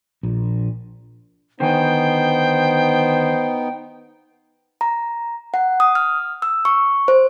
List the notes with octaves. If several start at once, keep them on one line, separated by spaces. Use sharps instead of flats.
A#1
D3 D#3 B3 D#4 C5 G5 G#5
A#5
F#5
D#6
F6
E6
C#6
C5